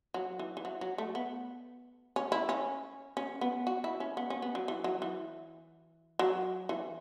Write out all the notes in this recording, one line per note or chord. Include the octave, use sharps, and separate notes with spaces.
F#3
E3
E3
F#3
F#3
A3
B3
C#4
E4
C#4
C#4
B3
F#4
E4
C#4
B3
C#4
B3
F#3
E3
F#3
E3
F#3
E3